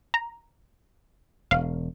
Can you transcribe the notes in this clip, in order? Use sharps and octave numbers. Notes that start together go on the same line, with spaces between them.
A#5
E1 F5